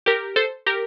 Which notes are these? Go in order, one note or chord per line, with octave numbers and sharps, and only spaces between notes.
G4 A#4
A4 C5
G4 A#4